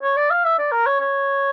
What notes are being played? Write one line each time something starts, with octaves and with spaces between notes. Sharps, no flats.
C#5
D5
F5
E5
D5
A#4
C#5
C#5